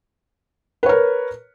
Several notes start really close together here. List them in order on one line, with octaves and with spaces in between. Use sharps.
B4 C#5 A#4